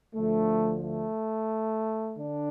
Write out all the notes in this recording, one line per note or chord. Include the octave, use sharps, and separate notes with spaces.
D2 D3 F3 A3
A3
D3 D4